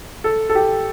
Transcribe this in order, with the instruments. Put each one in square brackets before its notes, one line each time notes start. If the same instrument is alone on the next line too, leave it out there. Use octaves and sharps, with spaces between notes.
[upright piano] A4
A4
G4